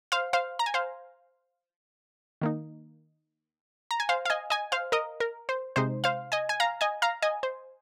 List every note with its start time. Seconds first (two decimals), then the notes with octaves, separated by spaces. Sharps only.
0.12 C5 F5
0.33 C5 F5
0.59 A#5
0.66 G#5
0.74 C5 F5
2.41 D#3 A#3 D#4
3.91 A#5
4.00 G#5
4.09 C5 F5
4.25 F5
4.30 D#5 G#5
4.50 D#5 G#5
4.72 C5 F5
4.92 A#4 D#5
5.20 A#4
5.49 C5
5.76 C3 G#3 D#4 C5
6.04 C5 F5
6.32 D#5 G#5
6.49 G#5
6.60 F5 A#5
6.81 D#5 G#5
7.02 F5 A#5
7.22 D#5 G#5
7.43 C5